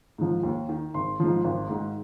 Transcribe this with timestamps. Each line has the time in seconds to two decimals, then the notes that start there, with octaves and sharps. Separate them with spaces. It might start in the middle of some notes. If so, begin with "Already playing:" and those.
0.18 G#2 F3
0.43 D#2
0.69 D#3
0.94 G#1 C6
1.20 G#2 F3
1.44 G#1
1.69 G#2 D#3